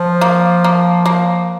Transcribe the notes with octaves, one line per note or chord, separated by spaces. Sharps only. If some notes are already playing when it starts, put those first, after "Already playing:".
Already playing: F3
A#3
A#3
A#3